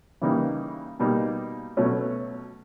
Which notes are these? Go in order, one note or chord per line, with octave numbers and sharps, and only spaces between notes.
C#3 E3 G3 A#3 D#4
B2 G3 A#3 D#4
B2 F#3 A3 C#4